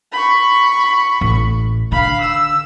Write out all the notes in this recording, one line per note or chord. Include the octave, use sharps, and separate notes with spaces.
B5 C#6
A1
D3 F5 B5
E6